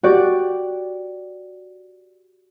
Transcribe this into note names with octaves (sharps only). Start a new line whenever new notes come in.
F#4 G4 D5